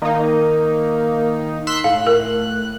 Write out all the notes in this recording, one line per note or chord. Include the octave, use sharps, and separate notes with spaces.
D#3 A#3 D#4
C6 E6 F#6 B6
A2 F5
A#4